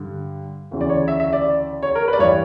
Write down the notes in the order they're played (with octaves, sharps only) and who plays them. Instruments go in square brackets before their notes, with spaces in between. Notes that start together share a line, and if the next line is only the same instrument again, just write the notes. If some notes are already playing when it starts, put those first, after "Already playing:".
Already playing: [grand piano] G2 D3
D2 C#3 E3
D5
C#5
E5
E5
D5
C#5
A#4
B4
D5
G2 E3 C#5